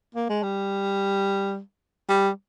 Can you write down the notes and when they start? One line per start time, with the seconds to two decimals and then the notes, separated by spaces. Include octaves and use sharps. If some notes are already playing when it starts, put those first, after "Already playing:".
0.15 A#3
0.29 G#3
0.43 G3
2.09 G3